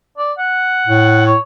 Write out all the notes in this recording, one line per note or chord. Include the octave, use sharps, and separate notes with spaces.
D5
F#5
A2
C#5